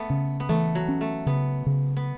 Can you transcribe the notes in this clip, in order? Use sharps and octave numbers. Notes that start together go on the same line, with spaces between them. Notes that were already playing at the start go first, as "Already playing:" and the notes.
Already playing: A3 B3
C#3
B3
E3 A3
F#3
C#4
A3
C#3 B3
C#3
B3